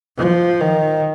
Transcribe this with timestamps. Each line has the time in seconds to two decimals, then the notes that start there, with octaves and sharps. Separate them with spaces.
0.18 F3
0.61 D#3